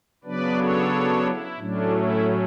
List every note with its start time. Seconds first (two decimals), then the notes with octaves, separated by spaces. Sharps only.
0.24 C#3 F#3 B3 D4 B4 D5
0.57 A4 C#5
1.24 E4
1.58 A2 F#3 A3 C#4 D4
1.91 E4